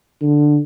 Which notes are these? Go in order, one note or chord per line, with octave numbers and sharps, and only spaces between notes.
D3